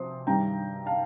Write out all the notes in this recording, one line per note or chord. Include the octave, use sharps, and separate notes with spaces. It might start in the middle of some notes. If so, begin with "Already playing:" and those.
Already playing: C3 F3 C4 C6 D#6
G2 D#3 G3 G5 A#5
F5 A5